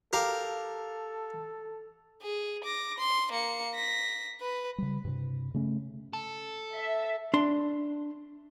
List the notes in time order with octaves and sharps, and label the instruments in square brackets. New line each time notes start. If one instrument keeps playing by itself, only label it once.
[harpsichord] G4 A#4 F5 [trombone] A4
[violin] G#4
D6 A#6
C6
A#3 C#7
A#6 B6
B4
[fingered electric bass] C#3 G3
G2 C3
C#3 A3 C#4
[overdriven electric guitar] A4
[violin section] E5
[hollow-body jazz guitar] D4 C6